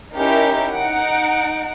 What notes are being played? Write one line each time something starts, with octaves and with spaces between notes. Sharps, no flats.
C#4 D#4 E4 G4 A#4
D#4 F#5 D7